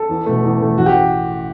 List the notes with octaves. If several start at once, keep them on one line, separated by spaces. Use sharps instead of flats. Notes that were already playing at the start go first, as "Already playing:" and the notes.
Already playing: A4
E2
B2 A3
E2
B2 A3
A1 F#4
G4